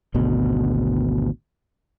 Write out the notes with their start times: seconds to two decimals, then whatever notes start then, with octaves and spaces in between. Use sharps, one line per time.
0.14 G#1 D2 B2